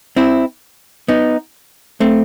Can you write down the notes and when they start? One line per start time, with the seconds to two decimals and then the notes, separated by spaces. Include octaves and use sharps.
0.16 C4 E4
1.08 B3 D#4
2.00 A3 C4